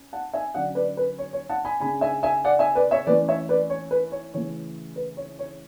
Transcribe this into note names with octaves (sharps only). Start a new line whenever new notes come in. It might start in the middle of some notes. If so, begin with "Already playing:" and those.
Already playing: C#4
F#5 A5
E5 G#5
D3 F#3 C#4 D5 F#5
B4 D5
B4
C#5
C#5
F#5 A5
G#5 B5
C#3 G#3 D4 G#5 B5
E5 G#5
E5 G#5
D5 F#5
E5 G#5
B4 D5
C#5 E5
E3 A3 C#4 B4 D5
C#5 E5
B4 D5
C#5
B4
C#5
C#3 E3 A3 C#4 C#5
B4
C#5
C#5